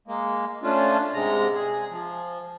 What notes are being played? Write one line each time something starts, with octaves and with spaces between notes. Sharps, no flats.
G#3 A#3
A3 C#4 D4 F4
G#2 C3 G#3 A#5
G#4
F3